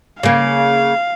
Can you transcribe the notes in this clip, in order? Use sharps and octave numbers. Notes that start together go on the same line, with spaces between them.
C#3 A#3 F5